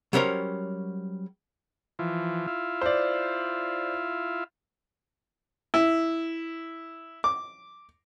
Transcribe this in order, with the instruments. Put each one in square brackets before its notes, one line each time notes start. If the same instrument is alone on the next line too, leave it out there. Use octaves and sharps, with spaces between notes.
[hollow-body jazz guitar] F#3 G3 C#4 A#4 C5 C#5
[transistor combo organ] E3 F3
E4 F4
[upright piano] C5 D5
[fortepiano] E4
D6